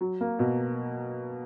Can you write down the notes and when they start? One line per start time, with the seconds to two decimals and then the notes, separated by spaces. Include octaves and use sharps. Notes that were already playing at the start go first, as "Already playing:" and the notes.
0.01 F#3
0.21 A#3
0.39 B2